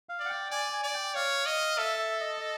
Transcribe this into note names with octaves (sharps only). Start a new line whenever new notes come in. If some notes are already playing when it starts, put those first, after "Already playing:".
F5
D5
F#5
G5
D5 G#5
G#5
D5
G5
C#5 F5
D#5
A4 E5
E5
D#5
D#5